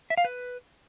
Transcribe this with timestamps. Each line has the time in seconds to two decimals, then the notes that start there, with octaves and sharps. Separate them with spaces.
0.10 E5
0.17 F5
0.25 B4